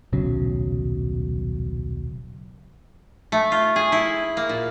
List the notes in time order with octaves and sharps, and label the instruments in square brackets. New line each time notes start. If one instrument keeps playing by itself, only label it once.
[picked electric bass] D#1 B1 C#3 F#3
[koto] A3
F4
G#4
E4
A#3
A#2